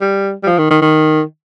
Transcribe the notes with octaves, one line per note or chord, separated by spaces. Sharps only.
G3
G3
F3
D#3
D#3
D#3